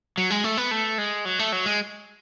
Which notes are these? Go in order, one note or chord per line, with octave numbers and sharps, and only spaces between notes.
F#3
G#3
A3
B3
A3
G#3
F#3
A3
F#3
G#3